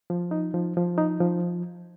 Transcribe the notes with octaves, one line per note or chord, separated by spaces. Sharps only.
F3
D#4
F3
F3
D#4
F3